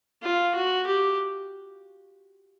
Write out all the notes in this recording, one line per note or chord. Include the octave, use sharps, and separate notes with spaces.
F4
F#4
G4